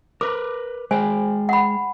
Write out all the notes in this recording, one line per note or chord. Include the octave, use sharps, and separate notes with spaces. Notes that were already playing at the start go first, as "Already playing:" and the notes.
A#4 B4 D6
G#3 G#4 C5 G5 G#5
F#5 B5